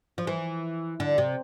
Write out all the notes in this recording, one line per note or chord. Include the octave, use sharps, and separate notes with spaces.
F3
E3
D3
C3